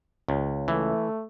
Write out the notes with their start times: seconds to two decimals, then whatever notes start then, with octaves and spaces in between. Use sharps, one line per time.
0.29 C#2
0.68 E3 A3